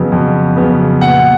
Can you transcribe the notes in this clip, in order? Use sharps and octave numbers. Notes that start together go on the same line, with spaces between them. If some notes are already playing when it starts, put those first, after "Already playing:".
Already playing: F2 C#3 F#3 B3
F2
C#3 F#3 B3
A#2 F#5